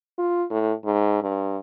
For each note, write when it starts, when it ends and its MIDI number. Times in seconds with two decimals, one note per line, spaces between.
0.18 0.45 65
0.51 0.73 45
0.85 1.21 44
1.22 1.58 43